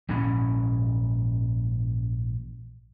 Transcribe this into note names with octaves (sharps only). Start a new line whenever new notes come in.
A#1 G#2 E3 C#4